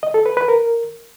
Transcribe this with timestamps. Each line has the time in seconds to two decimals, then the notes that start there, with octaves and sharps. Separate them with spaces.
0.03 D#5
0.14 A4
0.26 B4
0.37 B4
0.48 A#4